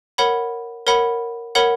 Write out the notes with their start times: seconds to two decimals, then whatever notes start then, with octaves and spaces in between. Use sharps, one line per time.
0.18 A#4 C#5 F#5 B5
0.87 A#4 C#5 F#5 B5
1.55 A#4 C#5 F#5 B5